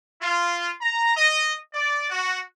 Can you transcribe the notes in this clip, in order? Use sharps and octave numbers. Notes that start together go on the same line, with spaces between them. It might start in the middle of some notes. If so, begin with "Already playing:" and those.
F4
A#5
D#5
D5
F#4